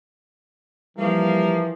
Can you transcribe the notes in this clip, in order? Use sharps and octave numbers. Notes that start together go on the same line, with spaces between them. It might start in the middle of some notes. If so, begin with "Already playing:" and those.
E3 F3 G3 A#3